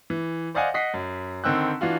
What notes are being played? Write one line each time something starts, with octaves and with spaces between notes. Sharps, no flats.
E3
C5 D5 D#5 F5 F#5 G#5
D#5 F#5 B6 C7
F#2
D3 D#3 C4 E6 F#6
E3 D4 F4 F#4